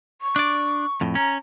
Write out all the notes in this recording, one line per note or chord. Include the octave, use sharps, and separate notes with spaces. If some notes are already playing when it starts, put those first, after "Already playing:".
C#6
D4 D5
F2 A2
C#4 A#5